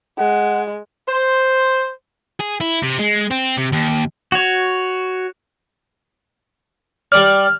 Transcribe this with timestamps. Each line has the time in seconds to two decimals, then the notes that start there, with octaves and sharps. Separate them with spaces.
0.19 G#3 F#5
1.08 C5
2.40 G#4
2.61 E4
2.82 C3
2.99 G#3
3.31 C4
3.57 C3
3.72 D#2
4.32 F#4 C#5
7.12 G3 D5 F6